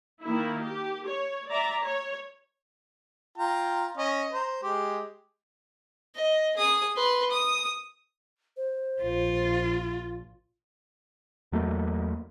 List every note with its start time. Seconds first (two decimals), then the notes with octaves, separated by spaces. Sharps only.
0.23 D#3 A#3 E4
0.62 G4
1.07 C#5
1.48 D5 E5 A#5
1.84 C#5
3.38 F4 G5 A#5
3.97 C#4 D#5
4.33 C5 A#5
4.63 G#3 G4
6.15 D#5
6.56 G#4 D#6
6.96 B4 C6
7.31 D#6
8.56 C5
9.02 A#1 F4
11.52 E2 F#3 A3 A#3